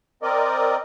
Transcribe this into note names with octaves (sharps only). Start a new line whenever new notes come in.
C4 A#4 D5 D#5